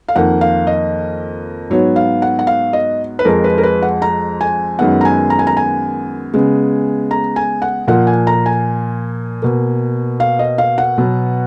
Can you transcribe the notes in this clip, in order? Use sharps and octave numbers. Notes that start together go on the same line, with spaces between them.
F5
F2 D#3 A#3 F#5
F5
D#5
G#2 F#3 B3 C#5
F5
F#5
F#5
F5
D#5
B4
F2 F3 G#3 A#4
B4
A#4
B4
F#5
A#5
G#5
F#2 D#3 G#3 B3 F#5
A#5
G#5
A#5
G#5
A#5
G#5
C#3 G#3 B3
A#5
G#5
F#5
A#2 F3 A#3 F#5
G#5
A#5
G#5
B2 A#3
F5
D#5
F5
F#5
B2 F#3 B3